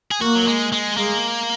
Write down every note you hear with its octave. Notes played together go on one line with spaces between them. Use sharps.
G#4
A#3 F#4
F#3
G#3
G#3
G#3 A#3